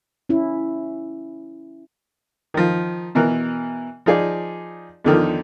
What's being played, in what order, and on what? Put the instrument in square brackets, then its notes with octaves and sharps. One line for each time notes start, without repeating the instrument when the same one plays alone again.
[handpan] C#4 E4
[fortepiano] D#3 F3
B2 E3 A#4
F3 D#4 G#4 D5
E2 D3 D#3 F3